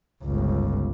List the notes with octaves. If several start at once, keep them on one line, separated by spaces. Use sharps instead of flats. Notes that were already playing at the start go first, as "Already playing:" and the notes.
G1 C#2